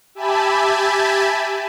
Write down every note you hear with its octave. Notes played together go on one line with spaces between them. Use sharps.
G4 E5 G#5 A5 B5